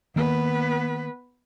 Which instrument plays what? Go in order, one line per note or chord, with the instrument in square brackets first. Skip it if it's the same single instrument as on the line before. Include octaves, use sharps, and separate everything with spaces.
[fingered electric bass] D#3 A#3 [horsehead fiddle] B3 B4